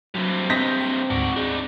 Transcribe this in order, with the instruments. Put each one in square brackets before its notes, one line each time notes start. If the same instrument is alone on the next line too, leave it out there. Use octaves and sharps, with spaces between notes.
[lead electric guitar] G2 C3 [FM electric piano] F#3
[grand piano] C4 A#6 B6 [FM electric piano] D#5 D#6 G6
[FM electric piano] G5
[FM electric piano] D2 G#2 [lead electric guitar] F#4 D5
[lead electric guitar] D4 D#4 [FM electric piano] G#4 D6